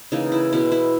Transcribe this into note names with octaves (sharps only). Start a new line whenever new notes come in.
C#3 E3 A#3 D#4
E4
B2 G#3 B3 E4
E4